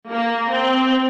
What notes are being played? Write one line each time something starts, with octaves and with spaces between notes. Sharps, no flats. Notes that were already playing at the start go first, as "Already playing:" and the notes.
A#3
C4